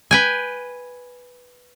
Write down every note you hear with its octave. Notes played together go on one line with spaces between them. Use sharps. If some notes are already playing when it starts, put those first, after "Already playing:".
B4 G5 G#5